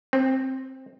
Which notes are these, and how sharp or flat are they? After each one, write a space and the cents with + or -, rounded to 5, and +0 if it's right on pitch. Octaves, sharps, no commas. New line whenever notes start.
C4 +10